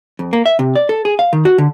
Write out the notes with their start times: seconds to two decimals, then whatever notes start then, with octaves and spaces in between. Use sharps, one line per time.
0.19 F2
0.33 A#3
0.46 E5
0.59 C3
0.75 D5
0.89 A4
1.05 G#4
1.19 F5
1.33 D#3
1.45 F#4
1.58 D3